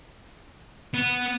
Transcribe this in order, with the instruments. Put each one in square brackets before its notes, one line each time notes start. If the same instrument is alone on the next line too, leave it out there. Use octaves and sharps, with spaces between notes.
[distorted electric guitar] B3